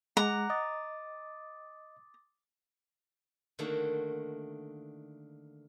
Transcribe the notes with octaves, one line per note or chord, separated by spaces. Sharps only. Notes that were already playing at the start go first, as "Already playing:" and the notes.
G#3 F#5 A#5 D6 F#6
D#5 D6 D#6 A6
D3 D#3 A3 A#3 F#4